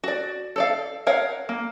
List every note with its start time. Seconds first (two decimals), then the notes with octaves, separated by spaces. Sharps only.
0.04 F#4 D5
0.56 A4 D5 F5
1.07 A#4 C#5 F5 F#5
1.49 A#3